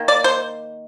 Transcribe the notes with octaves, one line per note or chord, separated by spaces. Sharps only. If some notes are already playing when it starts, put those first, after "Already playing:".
Already playing: D#3 A#3
D5
C5